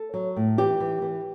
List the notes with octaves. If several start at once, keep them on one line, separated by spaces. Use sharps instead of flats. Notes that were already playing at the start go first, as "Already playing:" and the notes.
Already playing: A4
F#3
A2
E3 G4
E3
E3